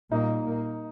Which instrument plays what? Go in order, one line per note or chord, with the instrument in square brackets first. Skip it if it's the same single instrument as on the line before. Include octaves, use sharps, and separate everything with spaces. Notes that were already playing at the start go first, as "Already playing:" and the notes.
[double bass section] A#2 G3 A#3 [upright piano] D#4
[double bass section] A#2 A#3